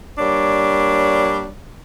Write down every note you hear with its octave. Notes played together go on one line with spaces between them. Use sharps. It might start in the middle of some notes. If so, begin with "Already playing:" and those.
G3 A#3 D4 C#5